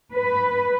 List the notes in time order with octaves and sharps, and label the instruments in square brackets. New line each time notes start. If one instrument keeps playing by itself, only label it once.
[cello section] B4